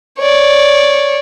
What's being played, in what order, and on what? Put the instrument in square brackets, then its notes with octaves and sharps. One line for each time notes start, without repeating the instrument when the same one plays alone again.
[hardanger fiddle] C#5 D5